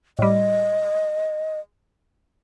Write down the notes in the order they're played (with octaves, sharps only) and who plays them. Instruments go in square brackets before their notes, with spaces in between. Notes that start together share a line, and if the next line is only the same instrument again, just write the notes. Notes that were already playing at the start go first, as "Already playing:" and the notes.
[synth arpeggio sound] A2 G3 [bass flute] D#5